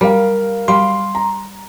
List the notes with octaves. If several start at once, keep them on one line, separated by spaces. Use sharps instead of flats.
G3 A#4 F5
G3 F5 C6
A#5